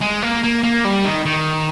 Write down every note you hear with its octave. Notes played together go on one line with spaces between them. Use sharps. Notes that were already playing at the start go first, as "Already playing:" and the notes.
G#3
A#3
A#3
A#3
G3
D#3
D#3